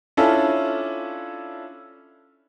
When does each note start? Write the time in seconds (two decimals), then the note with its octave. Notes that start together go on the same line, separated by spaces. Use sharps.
0.17 C#4 D4 E4 F4 A4